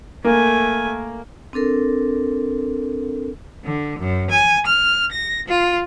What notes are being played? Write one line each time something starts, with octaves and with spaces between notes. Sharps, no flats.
A3 A#3 G#5
C4 D4 A4 A#4
D3
F#2
G#5
F6
A#6
F4